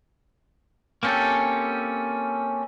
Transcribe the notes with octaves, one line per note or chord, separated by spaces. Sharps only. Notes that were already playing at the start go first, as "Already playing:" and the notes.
A#3 C4 C#4 G4 A4